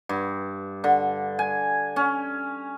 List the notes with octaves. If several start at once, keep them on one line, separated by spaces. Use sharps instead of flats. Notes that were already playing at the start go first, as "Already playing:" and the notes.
G2
D3
G#5
C#4